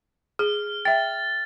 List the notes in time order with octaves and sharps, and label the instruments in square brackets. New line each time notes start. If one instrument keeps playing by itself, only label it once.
[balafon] G#4 [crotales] F6
[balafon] E5 G5 [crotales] A6